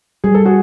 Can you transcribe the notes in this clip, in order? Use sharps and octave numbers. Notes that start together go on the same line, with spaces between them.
G3 G#4
A4
F#4 G#4